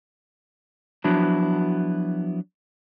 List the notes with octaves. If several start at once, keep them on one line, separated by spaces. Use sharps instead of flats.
F3 F#3 B3 D4 E4 F#4